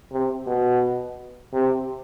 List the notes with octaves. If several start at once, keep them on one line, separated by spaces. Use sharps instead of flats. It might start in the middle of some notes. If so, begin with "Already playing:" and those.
C3
B2
C3